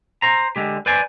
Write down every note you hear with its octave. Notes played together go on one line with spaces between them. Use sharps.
C5 A#5
D3 G#3 G4
B4 C5 D5 G#5